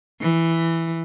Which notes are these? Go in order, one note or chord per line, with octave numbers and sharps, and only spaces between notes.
E3